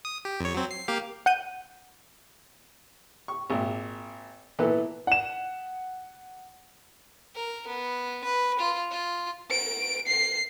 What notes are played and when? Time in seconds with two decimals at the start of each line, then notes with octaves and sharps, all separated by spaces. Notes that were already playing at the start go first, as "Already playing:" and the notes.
0.05 D#6
0.25 G4
0.41 F2 C#5
0.54 F#3 C4
0.71 C7
0.88 A#3 G4 F5
1.26 F#5 G6 D#7
3.28 C#6
3.50 G#1 A#2
4.59 A#2 E3 B3 A4
5.07 F#5 E7
7.36 A#4
7.67 B3
8.24 B4
8.59 F4
8.91 F4
9.51 D7
10.07 C7